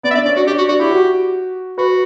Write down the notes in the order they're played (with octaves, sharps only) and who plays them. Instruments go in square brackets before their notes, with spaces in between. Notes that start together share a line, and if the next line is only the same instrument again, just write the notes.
[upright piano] B3 [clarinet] D5
[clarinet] E5
[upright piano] D4 [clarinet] D5
[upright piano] C#4 [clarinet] D5
[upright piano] D4 [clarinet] F#4
[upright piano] D4 [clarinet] G4
[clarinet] F#4
[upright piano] D4 [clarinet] F#4
[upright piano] E4 [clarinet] G4
[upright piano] F#4
[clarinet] F#4 [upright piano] B4